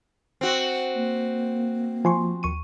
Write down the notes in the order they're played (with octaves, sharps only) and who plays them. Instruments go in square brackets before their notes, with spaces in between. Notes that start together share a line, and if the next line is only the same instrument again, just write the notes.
[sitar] C4 F#4
[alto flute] A#3
[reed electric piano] F3 [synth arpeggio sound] G#5 C6 C#6
[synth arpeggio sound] D#2 C#6 D#7